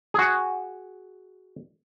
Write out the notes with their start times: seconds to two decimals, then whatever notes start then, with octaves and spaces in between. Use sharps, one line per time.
0.14 F#4 G#4